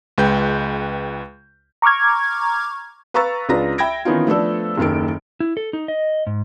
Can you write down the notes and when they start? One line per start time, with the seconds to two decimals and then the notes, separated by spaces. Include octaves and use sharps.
0.18 C#2 G#3 B4 G5 G6
1.82 A#5 C#6 D6 F6 G#6
3.14 B4 F5 A#5 C#6 E6 A6
3.49 C#2 D4 F4 B4 A#5 A#6
3.78 E5 G5 B5 G#6 A#6 D7
4.05 D#3 E3 B3 C#4 D#4 F4
4.27 F3 A3 B3 D4 A4
4.78 F#1 D#2 D#3 A4 D7
5.40 E4
5.57 A4
5.73 D#4
5.88 D#5
6.27 G#2